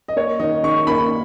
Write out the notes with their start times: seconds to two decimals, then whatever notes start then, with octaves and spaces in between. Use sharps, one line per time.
0.08 D#5
0.16 A#3 C#5
0.39 D#3 D#5
0.63 D#3 C#6
0.87 A#3 B5